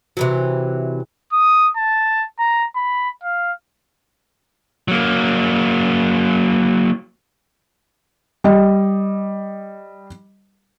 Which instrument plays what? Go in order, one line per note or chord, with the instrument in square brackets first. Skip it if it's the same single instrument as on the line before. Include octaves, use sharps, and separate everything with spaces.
[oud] C3 E3 F#3
[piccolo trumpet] D#6
A5
A#5
B5
F5
[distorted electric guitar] F#3 A#3
[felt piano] G3 D#5